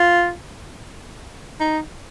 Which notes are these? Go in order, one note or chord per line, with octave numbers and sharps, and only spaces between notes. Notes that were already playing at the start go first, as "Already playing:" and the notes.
Already playing: F4
D#4